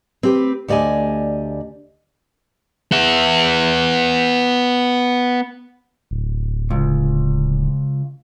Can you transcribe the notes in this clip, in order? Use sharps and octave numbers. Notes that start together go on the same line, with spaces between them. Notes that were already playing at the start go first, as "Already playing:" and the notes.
C4 G4 B4
D2 G4 D5 D#5 G#5
B3 E5
D1
C#2